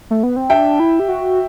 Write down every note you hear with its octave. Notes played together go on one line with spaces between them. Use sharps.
A3
B3
C4
D4 E5 G5
E4
G4
F#4